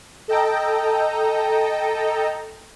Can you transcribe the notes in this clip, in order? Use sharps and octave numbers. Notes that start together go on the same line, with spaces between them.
A4 D#5 G5 A#5